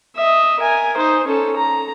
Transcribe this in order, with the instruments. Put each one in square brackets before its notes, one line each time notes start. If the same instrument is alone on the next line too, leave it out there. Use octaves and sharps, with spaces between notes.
[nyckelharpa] D#5 E5
A#4 G#5
D#4 C5
C#4 A4
A#5